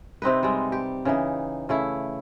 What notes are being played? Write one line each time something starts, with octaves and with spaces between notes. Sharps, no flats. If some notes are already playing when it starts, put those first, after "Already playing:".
C3 C4 D#4 B4
G3 G#3
G4
C#3 E3 D#4
C#3 A3 E4